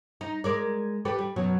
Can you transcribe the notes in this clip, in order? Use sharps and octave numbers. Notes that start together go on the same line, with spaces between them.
D#4
G#3 A#4 D5
G4 A4 B4
G3
F#2 B2 F#3